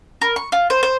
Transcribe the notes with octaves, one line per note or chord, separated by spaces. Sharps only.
A#4
C#6
F4
C5
C5